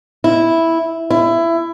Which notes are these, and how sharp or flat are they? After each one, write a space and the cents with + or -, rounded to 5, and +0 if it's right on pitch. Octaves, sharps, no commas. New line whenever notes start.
E4 -5
E4 +20